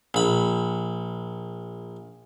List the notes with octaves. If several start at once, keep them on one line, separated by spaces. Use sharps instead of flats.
A#1 B5